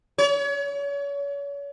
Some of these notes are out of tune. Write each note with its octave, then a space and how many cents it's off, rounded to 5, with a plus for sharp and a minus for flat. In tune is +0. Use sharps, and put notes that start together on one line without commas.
C#5 +35